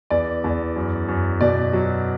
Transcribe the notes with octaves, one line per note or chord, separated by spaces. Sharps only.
E2 D5
E2
F#2
F#2
B2 D5
F#3